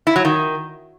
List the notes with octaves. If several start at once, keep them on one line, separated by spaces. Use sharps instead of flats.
E4
F#3
D#3